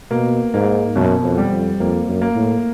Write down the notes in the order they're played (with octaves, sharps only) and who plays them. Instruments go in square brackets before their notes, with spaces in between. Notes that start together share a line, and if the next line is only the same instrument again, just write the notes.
[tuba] B2 [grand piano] A#3
[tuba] G#2 [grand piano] A#3
[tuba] F#2 [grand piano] B2
[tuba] F2
[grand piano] G3
[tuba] F2
[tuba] F2 [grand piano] A#3
[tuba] F#2
[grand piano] A#3
[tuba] A2